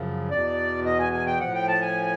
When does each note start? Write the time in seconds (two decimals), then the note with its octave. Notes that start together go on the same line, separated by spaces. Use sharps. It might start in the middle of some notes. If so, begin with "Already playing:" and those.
Already playing: F#2 C#3 F3
0.30 E2 B2 D5
0.85 D#5
0.99 G#5
1.13 G#5
1.26 G5
1.40 A2 F3 F#5
1.54 G5
1.68 A5
1.81 G#5